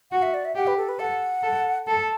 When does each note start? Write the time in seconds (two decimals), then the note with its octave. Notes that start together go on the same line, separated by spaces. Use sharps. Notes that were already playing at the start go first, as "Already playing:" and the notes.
0.11 F#4 F#5
0.22 E5
0.34 D5
0.45 E5
0.55 G4 F#5
0.67 B4
0.77 A4
0.89 B4
0.99 A4 F#5
1.43 A4
1.87 A4 A5